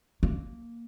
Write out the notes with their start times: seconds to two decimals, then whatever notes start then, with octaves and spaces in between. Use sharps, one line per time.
0.23 A#3